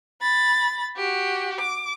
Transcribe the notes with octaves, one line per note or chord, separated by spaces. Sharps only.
B5 A6
F#4 G4
D6